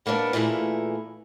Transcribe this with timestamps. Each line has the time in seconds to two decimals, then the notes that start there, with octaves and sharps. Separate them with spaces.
0.06 G3 A#3 B3 C#4 D4
0.33 A#2 E3 A3 A#3 G#4